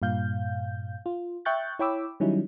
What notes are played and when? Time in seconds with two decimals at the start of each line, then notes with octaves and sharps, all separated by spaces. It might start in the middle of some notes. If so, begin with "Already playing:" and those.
0.02 G2 A#2 F5 G6
1.06 F4
1.45 E5 G5 C#6 F#6 G6 A6
1.79 E4 C#5 G5 B5 D6 E6
2.20 D#3 F#3 G3 C#4 D#4 E4